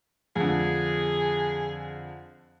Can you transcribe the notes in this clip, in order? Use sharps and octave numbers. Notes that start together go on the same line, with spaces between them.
F2 D3 G#4